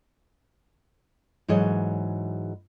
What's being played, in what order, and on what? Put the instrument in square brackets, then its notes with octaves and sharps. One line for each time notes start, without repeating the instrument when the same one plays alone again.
[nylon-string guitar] G#2 E3 F#3 G#4 C#5 D#5